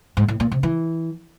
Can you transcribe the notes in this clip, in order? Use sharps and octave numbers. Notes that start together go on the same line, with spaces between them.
G#2
A2
A#2
C3
E3